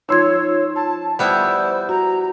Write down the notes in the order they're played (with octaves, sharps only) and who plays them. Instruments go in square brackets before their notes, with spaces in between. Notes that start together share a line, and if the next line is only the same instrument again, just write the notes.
[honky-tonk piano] F3 C6 E6 [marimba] D#4 G#6 [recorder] C#5
[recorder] A5
[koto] G3 B3 E4 [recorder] C5
[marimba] F#4 [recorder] A#5